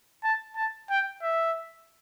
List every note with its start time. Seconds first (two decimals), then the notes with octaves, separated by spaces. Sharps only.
0.24 A5
0.56 A5
0.90 G5
1.23 E5